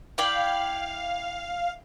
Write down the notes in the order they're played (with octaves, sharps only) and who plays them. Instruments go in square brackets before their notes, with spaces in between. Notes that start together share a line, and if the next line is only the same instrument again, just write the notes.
[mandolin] E4 D5 G5 [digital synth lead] F5